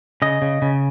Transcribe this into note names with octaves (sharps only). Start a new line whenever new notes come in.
C#3 D#5
C#3
C#3